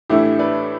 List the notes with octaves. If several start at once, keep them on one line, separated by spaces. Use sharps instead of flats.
A2 E3 A3 D4 E4 G4
B4 D5